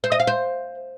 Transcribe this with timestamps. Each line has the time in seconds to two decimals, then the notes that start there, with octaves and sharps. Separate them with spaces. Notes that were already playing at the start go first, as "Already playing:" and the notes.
0.04 C5
0.12 D#5
0.20 F5
0.27 C5